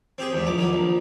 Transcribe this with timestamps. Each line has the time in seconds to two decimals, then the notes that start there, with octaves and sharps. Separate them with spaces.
0.18 C4 G4 G#4
0.33 E2 G#2
0.47 A#1 D6
0.58 D#3 F#3
0.73 A#1